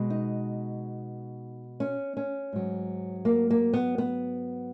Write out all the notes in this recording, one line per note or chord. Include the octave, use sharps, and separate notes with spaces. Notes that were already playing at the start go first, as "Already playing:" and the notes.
Already playing: B2 G#3
D#4
C#4
C#4
G#2 F#3
A#3
A#3
B3
B3